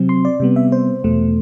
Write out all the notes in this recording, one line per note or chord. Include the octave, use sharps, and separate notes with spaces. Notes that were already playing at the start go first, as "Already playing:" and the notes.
Already playing: C3 F#3 C4
C6
D5
C3 G3 B3
E5
C5
E2 B2 A3